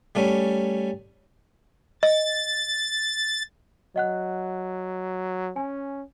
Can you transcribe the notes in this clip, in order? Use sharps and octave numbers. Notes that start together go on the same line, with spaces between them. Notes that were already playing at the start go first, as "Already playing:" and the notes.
G3 A3 C#4
D#5 A6
F#3 D#5 F#5 F#6
C#4 G#5